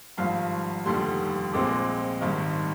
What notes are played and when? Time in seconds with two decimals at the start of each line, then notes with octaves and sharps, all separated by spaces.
0.17 G#1 G2 F3 F5
0.86 F1 D#2 D3 G3 C6
1.53 A#1 A#2 G#3 C4 D6
2.21 G#1 G2 D#3